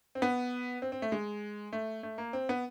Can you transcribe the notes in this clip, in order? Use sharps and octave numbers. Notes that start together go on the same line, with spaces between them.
C4
B3
C4
C4
A3
G#3
A3
A3
A#3
C4
B3